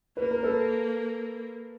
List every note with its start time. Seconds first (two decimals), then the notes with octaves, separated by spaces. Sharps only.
0.17 A#3 B4
0.31 A#4
0.43 A4 B4